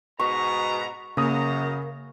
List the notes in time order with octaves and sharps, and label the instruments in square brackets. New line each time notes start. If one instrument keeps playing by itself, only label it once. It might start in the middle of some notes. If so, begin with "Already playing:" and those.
[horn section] G#2 B2 A#5 [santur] C#6
[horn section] F#2 A#5 [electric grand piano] C#3 D#6 [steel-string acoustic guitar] A#3